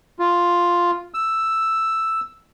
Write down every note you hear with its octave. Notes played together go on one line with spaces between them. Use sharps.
F4
E6